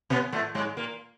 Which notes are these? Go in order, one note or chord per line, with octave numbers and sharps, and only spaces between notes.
B2 B3
A2 A3
G#2 G#3
A#2 A#3